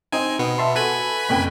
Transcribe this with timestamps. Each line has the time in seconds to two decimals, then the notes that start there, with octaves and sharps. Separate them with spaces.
0.12 C4 D#4 D#5 G#5
0.39 B2 B3
0.58 E5 A5 C6
0.76 F#4 A4 B4 G#5 B5
1.29 F#1 F2 G5